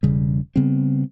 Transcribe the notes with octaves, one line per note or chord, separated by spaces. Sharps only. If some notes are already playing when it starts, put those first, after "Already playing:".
E1 C#3 G3
C#3 G3 B3 C4